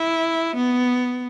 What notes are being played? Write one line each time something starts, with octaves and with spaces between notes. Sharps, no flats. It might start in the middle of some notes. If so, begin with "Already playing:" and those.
Already playing: E4
B3